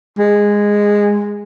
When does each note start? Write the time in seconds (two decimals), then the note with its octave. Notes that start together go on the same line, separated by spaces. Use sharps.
0.18 G#3